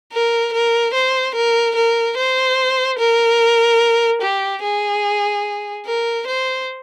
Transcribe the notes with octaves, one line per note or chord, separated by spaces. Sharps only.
A#4
A#4
C5
A#4
A#4
C5
A#4
G4
G#4
A#4
C5